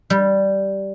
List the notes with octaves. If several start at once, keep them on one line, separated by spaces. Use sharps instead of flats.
G3